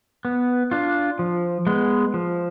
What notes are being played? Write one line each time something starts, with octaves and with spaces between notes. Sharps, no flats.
B3
D4 F4
F3
G#3 B3
F3